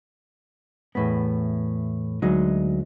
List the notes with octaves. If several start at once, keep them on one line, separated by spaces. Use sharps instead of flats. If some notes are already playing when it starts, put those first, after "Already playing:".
E2 A2 B3
D2 F#3 G#3 D#4